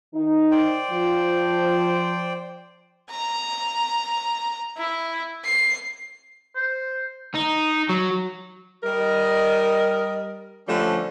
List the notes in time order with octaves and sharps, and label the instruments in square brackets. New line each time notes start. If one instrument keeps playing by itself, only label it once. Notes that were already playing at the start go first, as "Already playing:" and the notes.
[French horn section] D#3 D#4
[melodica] C5 D5 G5
[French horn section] F3
[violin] A#5
E4
C7
[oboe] C5
[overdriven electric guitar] D#4
F#3
[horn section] G3 A#4 D#5
D3 F3 G3 A3 C#4